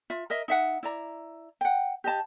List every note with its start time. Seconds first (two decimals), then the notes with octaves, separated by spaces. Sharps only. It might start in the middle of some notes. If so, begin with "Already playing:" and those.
0.10 F4 E5
0.30 A#4 D#5 E5
0.48 D#4 E5 F#5
0.83 E4 D5 A#5
1.61 F#5 G5
2.04 G4 D#5 A5